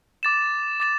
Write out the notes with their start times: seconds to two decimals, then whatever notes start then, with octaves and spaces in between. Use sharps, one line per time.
0.23 D6 A6 E7
0.80 D6 A6 E7